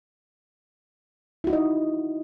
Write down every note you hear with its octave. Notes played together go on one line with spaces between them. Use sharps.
D#4 E4 F#4 D#5